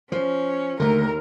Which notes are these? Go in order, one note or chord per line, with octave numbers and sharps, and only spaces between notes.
F3 C#4
D#2 D3 A3 A#4